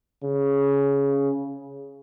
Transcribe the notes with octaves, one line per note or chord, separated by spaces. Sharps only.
C#3